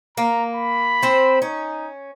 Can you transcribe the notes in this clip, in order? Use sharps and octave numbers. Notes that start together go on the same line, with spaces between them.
A#3 A#5
B5
C4 C5
C#4 D#4